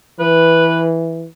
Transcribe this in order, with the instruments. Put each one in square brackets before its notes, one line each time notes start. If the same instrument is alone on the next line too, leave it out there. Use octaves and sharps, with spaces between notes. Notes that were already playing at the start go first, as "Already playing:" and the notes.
[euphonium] E3 [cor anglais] B4